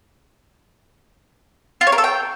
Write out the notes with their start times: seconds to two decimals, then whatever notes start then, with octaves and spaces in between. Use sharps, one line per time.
1.81 F4
1.87 C#5
1.92 A#4
1.98 A4
2.04 G5